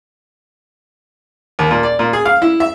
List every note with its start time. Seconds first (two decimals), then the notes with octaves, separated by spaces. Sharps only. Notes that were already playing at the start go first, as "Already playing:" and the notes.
1.59 D#2
1.71 A#2
1.83 D5
1.99 A#2
2.13 G#4
2.25 F5
2.42 E4
2.60 E5